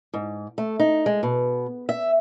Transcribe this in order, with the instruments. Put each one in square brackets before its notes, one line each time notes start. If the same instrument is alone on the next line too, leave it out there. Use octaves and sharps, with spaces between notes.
[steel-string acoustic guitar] G#2
A3
D#4
G#3
B2
E5